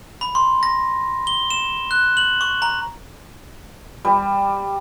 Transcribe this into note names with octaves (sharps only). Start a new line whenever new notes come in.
B5
C6
A#6
G7
E7
F#6
F#7
C#6
A#5
G3